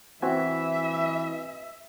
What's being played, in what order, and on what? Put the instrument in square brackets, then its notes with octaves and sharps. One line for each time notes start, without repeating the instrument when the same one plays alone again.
[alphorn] E3 [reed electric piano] C4 F#4 G#5 [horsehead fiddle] E5